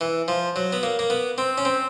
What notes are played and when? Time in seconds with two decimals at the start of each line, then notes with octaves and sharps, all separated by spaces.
0.01 E3
0.28 F3
0.56 F#3
0.73 B3
0.83 A#3
0.99 A#3
1.10 B3
1.38 C4
1.58 C#4
1.65 C4